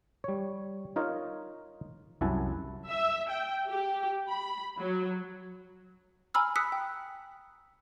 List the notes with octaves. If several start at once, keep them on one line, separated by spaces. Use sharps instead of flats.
G3 C#5
D#4 F4 A#4 C#5 D#5
C2 F#2 E4 F#5 G#5 A5
E5
G5
G4
B5
F#3
G#5 A#5 B5 E6 F6
D#6 E6 F#6 B6 C#7
G5